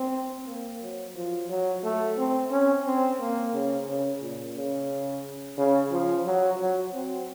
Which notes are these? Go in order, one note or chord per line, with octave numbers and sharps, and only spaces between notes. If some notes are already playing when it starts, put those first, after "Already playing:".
Already playing: C4
A#3
F#3
F3
F#3
A3
C4
C#4
C4
A#3
C#3
C#3
A#2
C#3
C#3
F3
F#3
F#3
C4